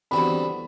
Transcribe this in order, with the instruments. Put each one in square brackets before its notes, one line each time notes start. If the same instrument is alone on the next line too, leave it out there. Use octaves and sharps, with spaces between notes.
[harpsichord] E2 D3 G3 C4 F#4 [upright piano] B5